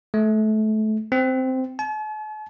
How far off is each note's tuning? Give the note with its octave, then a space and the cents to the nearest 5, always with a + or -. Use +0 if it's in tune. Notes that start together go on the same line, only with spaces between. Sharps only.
A3 -25
C4 -10
A5 -45